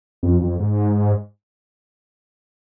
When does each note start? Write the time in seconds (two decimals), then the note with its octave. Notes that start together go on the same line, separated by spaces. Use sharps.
0.23 F2
0.41 F2
0.60 G#2